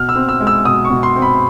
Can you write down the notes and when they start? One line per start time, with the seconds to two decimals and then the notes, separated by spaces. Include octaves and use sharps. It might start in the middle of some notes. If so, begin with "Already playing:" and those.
Already playing: B2 F6
0.09 E6
0.16 C4
0.29 E6
0.40 G#3
0.47 E6
0.65 B2 D#6
0.85 C#6
0.90 B2
1.03 C6
1.16 C4
1.22 B5